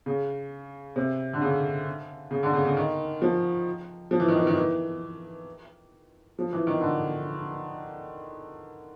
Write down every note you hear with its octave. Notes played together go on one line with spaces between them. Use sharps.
C#3
C3
D3
C#3
C#3
D3
C#3
C#3
D#3
F3
F3
E3
D#3
E3
D#3
E3
F3
E3
D#3
D3